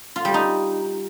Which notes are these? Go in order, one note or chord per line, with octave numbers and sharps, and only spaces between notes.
F4
G3
D#4